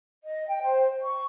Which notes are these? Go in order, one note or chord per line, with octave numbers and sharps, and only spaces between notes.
D#5
G5
C5
C#6